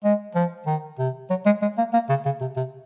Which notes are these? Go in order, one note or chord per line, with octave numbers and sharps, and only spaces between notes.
G#3
F3
D#3
C3
F#3
G#3
G#3
A#3
A#3
C#3
C#3
C3
C3